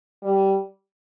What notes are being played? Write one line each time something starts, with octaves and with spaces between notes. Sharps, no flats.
G3